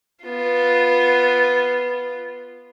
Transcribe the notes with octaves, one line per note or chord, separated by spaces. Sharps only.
B3 F4